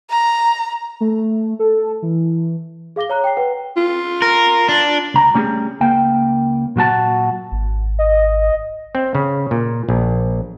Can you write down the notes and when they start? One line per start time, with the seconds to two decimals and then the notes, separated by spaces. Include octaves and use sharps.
0.11 A#5
1.01 A3
1.59 A4
2.02 E3
2.96 G#4 F5 D6 A#6 G7
3.10 C#5 A#5 F#6
3.24 G5 C7
3.37 B4 F#5 G5
3.77 F4
4.22 A#4
4.69 D4
5.14 C#2 A#5
5.35 G3 A3 C#4 F#4 G#4
5.80 C#2 A#3 G5
6.76 A#2 F#3 F#4 A5
7.52 G#1
7.99 D#5
8.95 C4
9.15 C#3
9.51 A#2
9.89 A#1